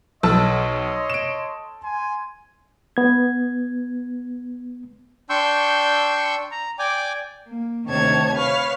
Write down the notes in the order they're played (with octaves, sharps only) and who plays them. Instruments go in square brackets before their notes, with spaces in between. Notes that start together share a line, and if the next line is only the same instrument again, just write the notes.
[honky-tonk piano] B1 [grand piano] A4 A5 E6 [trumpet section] C#5 D#5 C6
[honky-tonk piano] D7 E7
[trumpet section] G#5 C6
[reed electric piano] B3 G#6
[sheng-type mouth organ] D4 G5 C6 C#6 E6 G6
A#5
D5 G5 G#5 D6
[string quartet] A#3
D2 C3 D#3 C#5 A5 G#6
B4 C#5 F5